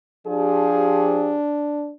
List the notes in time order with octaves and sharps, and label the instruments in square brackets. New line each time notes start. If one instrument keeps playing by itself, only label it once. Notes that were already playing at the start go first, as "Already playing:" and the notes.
[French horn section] F3 G4 G#4 [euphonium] D4